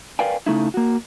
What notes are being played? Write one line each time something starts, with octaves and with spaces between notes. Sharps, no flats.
A#4 B4 D5 F5 G5 G#5
C#3 A3 D#4 E4
A#3 F#4